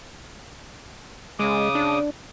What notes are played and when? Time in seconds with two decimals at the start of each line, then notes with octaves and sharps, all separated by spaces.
1.39 C#3 G#3 D6 D#6
1.75 D4